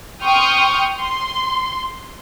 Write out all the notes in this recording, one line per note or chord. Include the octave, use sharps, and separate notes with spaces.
G5 C6 C#6 D#6 F6 G6
C6